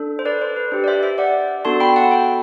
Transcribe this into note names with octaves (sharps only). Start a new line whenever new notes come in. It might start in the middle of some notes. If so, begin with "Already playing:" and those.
Already playing: D4 A4
C5
B4 D5
C5
B4
D4 G4 C5
D5
C5 E5
C5 E5
D5 F#5
B3 D4 F#4 A4 A5 C6
G5 B5
F#5 A5
G5 B5